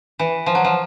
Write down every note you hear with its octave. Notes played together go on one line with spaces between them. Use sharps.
E3
F3
F#3
F3